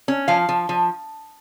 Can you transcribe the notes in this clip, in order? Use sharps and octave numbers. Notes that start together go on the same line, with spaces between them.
C#4
F3 F5
F3
F3